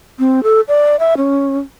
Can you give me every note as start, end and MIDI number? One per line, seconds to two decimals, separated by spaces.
0.19 0.43 60
0.43 0.61 69
0.68 0.96 74
0.99 1.14 76
1.17 1.59 61